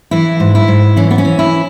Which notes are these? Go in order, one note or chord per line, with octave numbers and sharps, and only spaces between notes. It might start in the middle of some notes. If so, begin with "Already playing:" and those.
E3 E4
G#2
E4
G#2
E3 C#4
B3
C#4
E3
E4